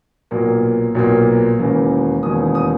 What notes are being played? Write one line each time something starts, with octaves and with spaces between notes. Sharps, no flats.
B1 A#2 A#3
B1 A#2 A#3
E1 D#2 C#3 E3 A#3
E1 D#2 C#3 E3 A#3 D#6
D#6